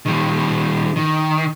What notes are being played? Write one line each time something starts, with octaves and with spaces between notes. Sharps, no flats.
D#3 G3
D#3